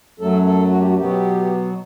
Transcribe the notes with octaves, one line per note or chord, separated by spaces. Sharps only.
F#2 F#3 A3 A4
A4
F#4
G4
F#4
B2 F#3 B3 G4